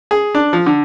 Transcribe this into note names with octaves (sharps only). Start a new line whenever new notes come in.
G#4
D4
F3
D3